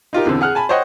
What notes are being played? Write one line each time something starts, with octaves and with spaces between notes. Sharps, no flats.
D#4 F4 G4 A#4
E2 D3 C4
G#4 F#5 F6 F#6
G#5 A5 B5
C5 C#5 D#5 F#5 G5